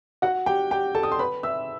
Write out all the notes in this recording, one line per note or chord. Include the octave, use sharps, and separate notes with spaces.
F#4 F#5
G4 G5
G4 G5
A4 A5
D#6
C6
B4 B5
E5 E6